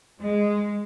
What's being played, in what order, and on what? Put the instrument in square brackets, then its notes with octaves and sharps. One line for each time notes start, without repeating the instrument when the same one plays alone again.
[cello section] G#3